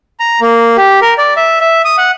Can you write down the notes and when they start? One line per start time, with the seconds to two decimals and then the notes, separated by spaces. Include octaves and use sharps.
0.20 A#5
0.41 A#3
0.77 G4
1.01 A#4
1.18 D5
1.37 E5
1.60 E5
1.85 D#6
1.98 F#5